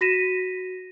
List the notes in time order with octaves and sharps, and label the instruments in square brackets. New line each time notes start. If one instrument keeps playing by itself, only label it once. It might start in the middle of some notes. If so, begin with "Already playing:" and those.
[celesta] F#4 A#6 B6 D#7 E7